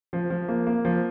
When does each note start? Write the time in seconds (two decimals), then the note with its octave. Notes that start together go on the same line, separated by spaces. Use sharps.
0.13 F3
0.30 F3
0.48 A#3
0.67 A#3
0.85 F3